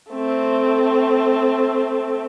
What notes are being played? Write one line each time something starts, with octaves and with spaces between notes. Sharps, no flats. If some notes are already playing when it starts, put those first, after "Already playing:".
A3 C4